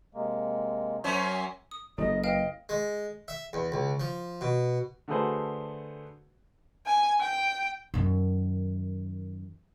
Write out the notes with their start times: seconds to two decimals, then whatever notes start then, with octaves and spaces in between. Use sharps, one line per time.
0.15 C3 G#3 A#3
1.04 F#2 F#3 C#4 C5 C#6
1.31 G#5 C6
1.71 D#6
1.98 F#1 E4 G4 A4 D#5
2.24 B4 D#5 F5 G5
2.69 G#3
3.28 E5
3.53 E2
3.72 C#2
4.00 F3
4.41 B2
5.08 D3 A3 F#4 G#4 B4 C5
6.87 G#5
7.20 G5
7.94 F#2 D#3